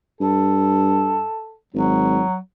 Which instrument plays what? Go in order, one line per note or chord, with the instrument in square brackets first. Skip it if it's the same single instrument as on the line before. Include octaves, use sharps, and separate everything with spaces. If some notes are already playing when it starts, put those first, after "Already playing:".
[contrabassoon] G2 [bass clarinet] A4
[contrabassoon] G#1 [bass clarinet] F#3